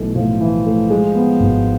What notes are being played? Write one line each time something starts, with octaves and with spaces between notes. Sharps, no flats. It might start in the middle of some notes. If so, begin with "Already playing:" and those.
Already playing: B1 E3 A3
A2 F3
E3
A3
G#3
B3
G#1